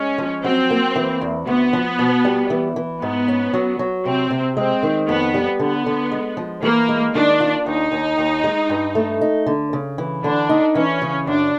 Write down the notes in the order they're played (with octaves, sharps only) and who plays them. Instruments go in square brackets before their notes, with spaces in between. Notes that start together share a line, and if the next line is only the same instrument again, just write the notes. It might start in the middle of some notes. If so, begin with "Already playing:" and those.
Already playing: [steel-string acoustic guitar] G#3 [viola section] C#4
[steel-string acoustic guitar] F3
[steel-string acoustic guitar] F#3 [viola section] C4
[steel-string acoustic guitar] A#3
E3
E2
[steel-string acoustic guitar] D2 [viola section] B3
[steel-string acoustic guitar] F3
B2
G3
E3
E3
[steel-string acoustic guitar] G#2 [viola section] B3
[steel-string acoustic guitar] C#4
F#3
F#3
[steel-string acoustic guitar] C3 [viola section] C4
[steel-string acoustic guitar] C3
[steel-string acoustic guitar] G#3 [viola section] C4
[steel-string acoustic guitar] D#3
[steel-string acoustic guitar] F2 [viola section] B3
[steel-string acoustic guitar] G3
[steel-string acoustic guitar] D3 [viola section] B3
[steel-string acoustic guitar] D3
G#3
F3
[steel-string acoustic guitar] E3 [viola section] A#3
[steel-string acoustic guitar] G#3
[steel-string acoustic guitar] D#3 [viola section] D4
[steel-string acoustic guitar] F4
[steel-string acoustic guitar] D#2 [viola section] D#4
[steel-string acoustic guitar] D#2
D#2
G#3
G2
A3
D#4
D3
C#3
E3
[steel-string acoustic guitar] D3 [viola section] D4
[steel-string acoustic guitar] D#4
[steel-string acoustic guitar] E3 [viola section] C#4
[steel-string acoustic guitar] C#3
[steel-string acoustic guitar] F#2 [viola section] D4